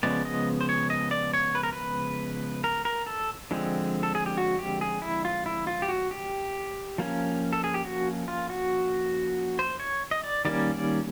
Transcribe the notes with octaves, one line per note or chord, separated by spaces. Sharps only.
C#3 F3 G#3 B3 D5
D#5
C5
C#5
D#5
D5
C#5
B4
A#4
B4
A#4
A#4
A4
D3 F3 G#3 C4
A4
G#4
G4
F#4
G4
G#4
E4
F4
E4
F4
G4
F#4
G4
F3 A#3 C#4
A4
G#4
G4
F#4
F4
F#4
C5
C#5
D#5
D5
D#3 G3 A#3 C#4 D5
D5